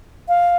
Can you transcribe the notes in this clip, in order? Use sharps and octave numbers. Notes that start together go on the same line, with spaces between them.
F5